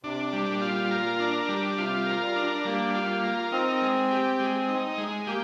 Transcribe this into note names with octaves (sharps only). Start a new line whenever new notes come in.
C3 D4
G3
A#2
F4
A#4
D4
G3
C3 F4
A#4
G3
D4
G3 A#3
F4
A#3
A#4
C4 D#4
G#3
G4
G#3
D#4
G#3
A#3 G4